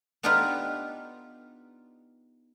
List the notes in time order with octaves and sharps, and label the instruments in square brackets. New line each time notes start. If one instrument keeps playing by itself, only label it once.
[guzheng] B3 D4 D#4 F4 G4 B4